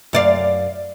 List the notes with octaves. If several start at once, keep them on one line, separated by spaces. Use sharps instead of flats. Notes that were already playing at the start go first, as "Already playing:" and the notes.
F#2 D5 F5